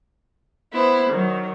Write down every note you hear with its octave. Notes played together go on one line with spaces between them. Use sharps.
B3 E4 C5
D#3 F#3